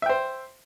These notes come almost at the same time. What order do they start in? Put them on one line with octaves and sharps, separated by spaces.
E5 G5 C5